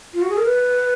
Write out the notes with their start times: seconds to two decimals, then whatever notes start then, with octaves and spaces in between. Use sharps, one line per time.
0.14 F4
0.22 F#4
0.30 G#4
0.37 A#4
0.46 B4